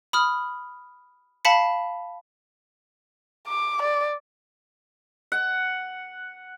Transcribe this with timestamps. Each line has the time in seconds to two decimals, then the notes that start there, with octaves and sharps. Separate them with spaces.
0.13 B5 D#6 F6
1.45 F5 A5 B5 B6 C#7
3.48 D6
3.82 D5
5.32 F#5